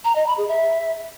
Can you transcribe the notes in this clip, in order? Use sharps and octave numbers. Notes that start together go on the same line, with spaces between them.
A#5
D#5
B5
G#4
E5